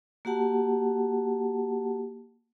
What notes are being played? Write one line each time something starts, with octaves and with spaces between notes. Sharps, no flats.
A#3 F#4 G4 F#5 A5